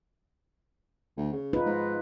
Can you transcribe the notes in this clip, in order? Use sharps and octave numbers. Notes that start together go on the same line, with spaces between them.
D2
C#3
D#4 F4 B4
G#2